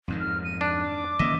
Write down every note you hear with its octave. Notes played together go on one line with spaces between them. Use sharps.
F2 G#2 D#3
F6
D#7
D4 F#6
D6
D#3 A#3 C#4 D#5 E5